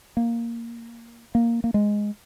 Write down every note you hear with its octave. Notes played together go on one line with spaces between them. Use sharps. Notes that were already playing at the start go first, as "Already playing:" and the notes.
A#3
A#3
A#3
G#3